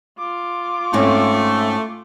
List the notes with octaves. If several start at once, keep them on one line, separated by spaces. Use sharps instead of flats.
F4 D6
G#2 A3 C4 C#4